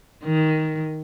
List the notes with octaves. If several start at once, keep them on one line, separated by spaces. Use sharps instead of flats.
D#3